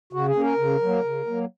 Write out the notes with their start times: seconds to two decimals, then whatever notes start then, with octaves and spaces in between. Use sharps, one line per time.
0.13 C#3 F#4
0.28 G#4
0.35 A#3 C#4
0.44 A#4
0.58 C#3
0.82 F#3 A#3
1.04 C#3
1.27 F#3 A#3